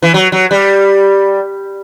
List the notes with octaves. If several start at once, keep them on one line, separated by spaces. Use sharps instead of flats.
E3
F#3
F#3
G3